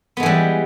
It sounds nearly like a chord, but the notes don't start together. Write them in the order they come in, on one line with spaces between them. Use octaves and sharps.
B3 G#3 E3 G3